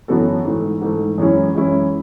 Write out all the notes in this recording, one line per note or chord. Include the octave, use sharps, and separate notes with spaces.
F#2 E3 B3 F#4 A4
G#2 E3 A3
G#2 E3 A3
F#2 E3 G#3 C#4 E4
F#2 E3 G#3 C#4 E4